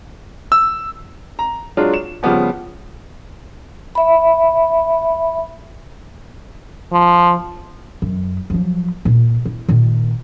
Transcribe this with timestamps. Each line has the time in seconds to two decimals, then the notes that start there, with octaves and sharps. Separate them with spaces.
0.52 E6
1.39 A#5
1.77 F#3 G#3 D4 F4
1.94 E7
2.23 C#3 F3 G3 B3 G4
3.95 E5 B5
6.93 F3
8.02 F#2
8.50 F3 F#3
9.05 A#2
9.46 E4
9.69 A#2 D#3